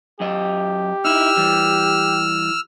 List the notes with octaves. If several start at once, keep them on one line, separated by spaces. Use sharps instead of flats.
F#2 G4 D#5
D#4 E4 E6 F6
E3 G3